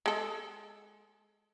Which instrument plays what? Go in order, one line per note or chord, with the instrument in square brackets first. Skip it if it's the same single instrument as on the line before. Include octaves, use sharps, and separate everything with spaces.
[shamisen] G#3 A4